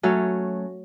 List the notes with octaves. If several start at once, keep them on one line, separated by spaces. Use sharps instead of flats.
F#3 A3 C#4